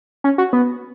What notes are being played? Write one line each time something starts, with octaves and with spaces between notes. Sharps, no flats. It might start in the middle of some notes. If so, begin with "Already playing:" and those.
C#4
F#4
B3